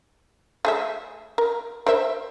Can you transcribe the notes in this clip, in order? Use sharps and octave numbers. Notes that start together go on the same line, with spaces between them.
A3 G#4 E5
A#4
A#4 C5 E5